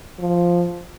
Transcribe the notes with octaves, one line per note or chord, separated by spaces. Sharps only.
F3